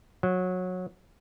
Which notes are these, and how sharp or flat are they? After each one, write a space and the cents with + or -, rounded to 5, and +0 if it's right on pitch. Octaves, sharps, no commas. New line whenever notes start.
F#3 -20